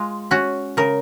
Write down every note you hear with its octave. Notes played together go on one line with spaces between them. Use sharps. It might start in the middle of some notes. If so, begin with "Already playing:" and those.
Already playing: G#3 F4
C#4 F#4
C#3 A#4